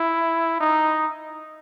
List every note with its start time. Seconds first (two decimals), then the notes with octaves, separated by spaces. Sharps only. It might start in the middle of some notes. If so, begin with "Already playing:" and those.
Already playing: E4
0.61 D#4